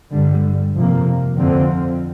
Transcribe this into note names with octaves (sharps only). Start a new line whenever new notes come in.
G2 D3 G3
F2 C3 F3 A#3
F2 D3 F3 C4